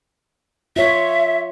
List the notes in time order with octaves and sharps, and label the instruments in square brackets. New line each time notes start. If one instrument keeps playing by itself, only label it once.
[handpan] F4 C#5 [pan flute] E5